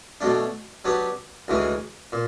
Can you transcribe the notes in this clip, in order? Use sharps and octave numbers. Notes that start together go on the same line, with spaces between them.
B2 F#3 A3 D4
F#3 B3 D4 G4
D2 C#3 E3 G#3
A#2